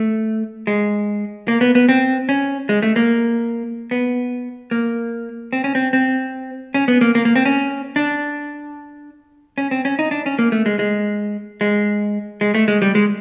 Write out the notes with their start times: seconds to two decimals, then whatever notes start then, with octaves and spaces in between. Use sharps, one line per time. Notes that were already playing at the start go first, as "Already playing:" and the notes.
Already playing: A3
0.67 G#3
1.48 A#3
1.61 B3
1.75 B3
1.89 C4
2.29 C#4
2.69 G#3
2.83 A3
2.96 A#3
3.91 B3
4.71 A#3
5.53 C4
5.64 C#4
5.75 C4
5.93 C4
6.74 C#4
6.88 B3
7.01 A#3
7.15 A#3
7.25 A#3
7.36 C4
7.45 C#4
7.96 D4
9.58 C#4
9.71 C4
9.85 C#4
9.99 D#4
10.11 D4
10.26 C#4
10.39 A#3
10.52 A3
10.66 G#3
10.79 G#3
11.61 G#3
12.41 G#3
12.55 A3
12.68 G#3
12.82 G3
12.95 G#3